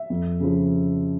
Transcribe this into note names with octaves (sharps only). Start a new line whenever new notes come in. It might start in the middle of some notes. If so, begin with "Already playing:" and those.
Already playing: E5
F2
C#3 F3